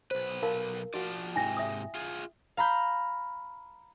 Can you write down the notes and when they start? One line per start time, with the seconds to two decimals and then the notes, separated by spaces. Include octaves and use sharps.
0.11 B1 B4 C5
0.43 F4 A#4 F5 A5
0.94 F3 F#4 D5 F#5
1.36 G#2 C3 E4 G5 G#5 A#6
1.57 E5 D#6
1.95 F4 G#4
2.57 F5 A#5 B5 G6